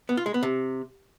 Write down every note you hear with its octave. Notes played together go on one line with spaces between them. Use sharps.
B3
F4
G#3
B3
C3